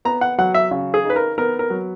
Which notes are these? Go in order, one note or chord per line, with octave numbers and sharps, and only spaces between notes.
B3 A#5
F#5
F#3 F#5
E5
C#3
G#4
D#4
B4
A#4
B3 A#4
A#4
F#3